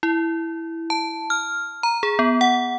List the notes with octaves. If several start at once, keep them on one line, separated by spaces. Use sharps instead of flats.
E4
A5
F6
A#5
G#4
B3
F#5